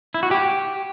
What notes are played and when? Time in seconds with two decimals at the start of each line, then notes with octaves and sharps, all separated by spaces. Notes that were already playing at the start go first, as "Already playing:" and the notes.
0.14 E4
0.23 F#4
0.31 G4